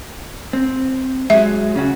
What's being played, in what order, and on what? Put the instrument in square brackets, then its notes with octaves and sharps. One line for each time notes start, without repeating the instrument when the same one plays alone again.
[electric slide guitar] C4
[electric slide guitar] F#3 G#3 [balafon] E5
[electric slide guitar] C#3 C#4 F#4